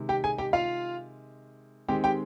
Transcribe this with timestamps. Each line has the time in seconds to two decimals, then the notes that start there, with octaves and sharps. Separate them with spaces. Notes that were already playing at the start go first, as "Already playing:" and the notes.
Already playing: C3 D#3 G#3
0.09 G4 G5
0.24 G#4 G#5
0.38 G4 G5
0.53 F4 F5
1.88 D#3 G#3 C4 G4 G5
2.04 G4 G5